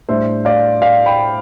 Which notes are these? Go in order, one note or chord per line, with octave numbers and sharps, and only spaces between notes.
A2 G3 D4 C5 E5
D5 F5
D5 F5
G5 B5